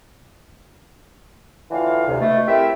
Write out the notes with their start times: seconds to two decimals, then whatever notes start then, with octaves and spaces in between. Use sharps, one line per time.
1.70 A2 D3 E3 F4 F5
2.07 D2 C3
2.20 B2 A3
2.46 A3 C4 E4 G4 A#4 E5